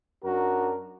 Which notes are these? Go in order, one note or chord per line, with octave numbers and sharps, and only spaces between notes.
F#2 D4 F#4 A#4